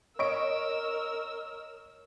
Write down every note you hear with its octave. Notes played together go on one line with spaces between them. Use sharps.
A#4 C#5 D#5 C#6 E6 D7